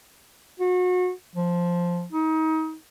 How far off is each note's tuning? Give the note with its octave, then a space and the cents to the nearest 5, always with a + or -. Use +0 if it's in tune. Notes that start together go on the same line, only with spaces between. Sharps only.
F#4 -30
F3 +0
D#4 +30